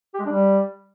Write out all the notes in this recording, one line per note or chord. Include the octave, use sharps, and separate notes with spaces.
G4
G#3
D4
G3